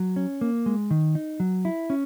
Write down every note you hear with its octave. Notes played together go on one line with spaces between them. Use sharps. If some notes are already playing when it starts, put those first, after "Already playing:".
Already playing: F#3
C#4
A#3
G#3
D#3
D#4
F#3
E4
C#4